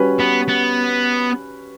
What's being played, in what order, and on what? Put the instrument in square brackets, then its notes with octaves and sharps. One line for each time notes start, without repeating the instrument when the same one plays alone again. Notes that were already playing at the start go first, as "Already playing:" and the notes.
Already playing: [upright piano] G3 C#4 F#4 B4
[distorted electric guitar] B3
B3